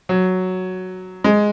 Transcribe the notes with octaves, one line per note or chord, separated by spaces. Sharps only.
F#3
G#3